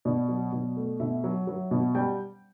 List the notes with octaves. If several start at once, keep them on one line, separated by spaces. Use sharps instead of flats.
B2 D5
F#3
B2
A3
B2 E5
F#3
F#3
B2
G3 G5